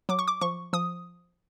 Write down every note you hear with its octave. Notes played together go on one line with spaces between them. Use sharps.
F#3 D6
C#6
D6
F3 C#6
F3 D#6